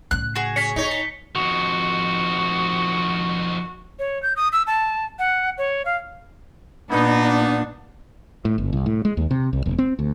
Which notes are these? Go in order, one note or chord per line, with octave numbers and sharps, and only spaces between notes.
A2 C#3 F#6
F#4 G#4
C#4 B6 C#7
B3 D#4 C#5
A5
F2 D#3 F#4
C#5
G6
D#6
E6
A5
F#5
C#5
F5
A#2 B3 D4 D#4
A2
G1
C2
A2
G#3
D#2
C3
C2
E1
C4
D2